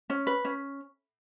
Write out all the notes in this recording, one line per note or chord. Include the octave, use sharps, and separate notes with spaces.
C#4
B4
C#4